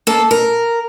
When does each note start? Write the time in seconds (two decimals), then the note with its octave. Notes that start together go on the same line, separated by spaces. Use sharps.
0.07 A#3 A4
0.31 A#4